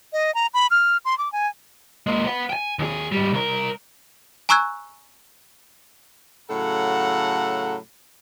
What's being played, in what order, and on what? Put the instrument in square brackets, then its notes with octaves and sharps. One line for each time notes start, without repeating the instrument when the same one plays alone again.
[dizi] D#5
A#5
B5
F6
C6
D6
G#5
[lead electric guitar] G#3 A#3
B4 F#5
G5 G#5
D#2 G#4
G#2 G3
C2 A#4
[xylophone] G#5 A#5 C#6 E6 F#6 G#6
[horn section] A2 C#3 F#3 A4 F#5 A#5